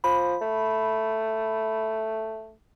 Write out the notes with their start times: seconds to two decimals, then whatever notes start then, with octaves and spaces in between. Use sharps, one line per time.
0.04 F3 B5
0.42 A3